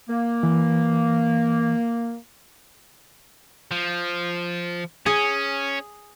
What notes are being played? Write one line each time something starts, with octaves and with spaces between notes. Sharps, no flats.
A#3
E3
F3
C#4 G#4